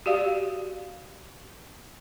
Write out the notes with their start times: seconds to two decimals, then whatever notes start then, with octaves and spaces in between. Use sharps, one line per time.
0.06 F#4 G4 D5 F5